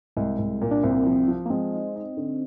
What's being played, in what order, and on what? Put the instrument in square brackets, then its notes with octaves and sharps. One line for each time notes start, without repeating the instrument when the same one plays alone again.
[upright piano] C2 [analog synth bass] G#3
[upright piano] C2
A#2
[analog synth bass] D4
[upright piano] C2 [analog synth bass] C4
[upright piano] F3
F3
[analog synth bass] A#3
[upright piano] G#3 [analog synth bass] C4
[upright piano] D#4
D#4
D3